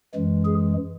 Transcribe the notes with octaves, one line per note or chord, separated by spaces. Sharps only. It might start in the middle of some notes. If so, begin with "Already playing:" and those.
F#2 E3 G#3
G#4